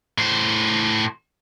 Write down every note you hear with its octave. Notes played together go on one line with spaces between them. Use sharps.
A2 C5